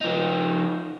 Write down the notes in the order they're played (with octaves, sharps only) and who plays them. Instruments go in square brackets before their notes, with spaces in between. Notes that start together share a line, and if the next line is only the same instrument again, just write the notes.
[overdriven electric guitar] F3 D#4